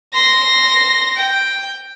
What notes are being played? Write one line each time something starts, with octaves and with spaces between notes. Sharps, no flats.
C6 A#6
G5